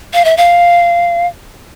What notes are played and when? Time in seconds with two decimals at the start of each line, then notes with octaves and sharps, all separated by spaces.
0.14 F5
0.25 E5
0.37 F5